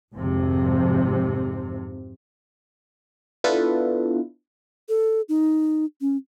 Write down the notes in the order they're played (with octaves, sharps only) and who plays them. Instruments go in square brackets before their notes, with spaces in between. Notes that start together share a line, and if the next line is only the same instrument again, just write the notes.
[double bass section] G#1 F2 C3
[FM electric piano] B3 D4 E4 F4 A4 B4
[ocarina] A4
D#4
C#4